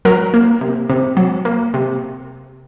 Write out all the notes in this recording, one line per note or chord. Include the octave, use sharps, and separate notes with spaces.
F#3 A#4
A#3
C3
C3
F#3
A#3
C3